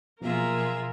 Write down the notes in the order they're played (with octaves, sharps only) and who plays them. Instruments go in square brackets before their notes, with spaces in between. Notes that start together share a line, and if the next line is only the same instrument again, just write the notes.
[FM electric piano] B2 F3 F#3 [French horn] A#3 [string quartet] F4 G#4 E5 [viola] A#4